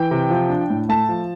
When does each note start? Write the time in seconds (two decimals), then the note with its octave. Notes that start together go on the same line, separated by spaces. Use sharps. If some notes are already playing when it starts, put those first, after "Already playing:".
Already playing: E3 G5
0.11 C3
0.30 F3
0.50 D4
0.70 A2
0.89 A3 A5
1.09 F3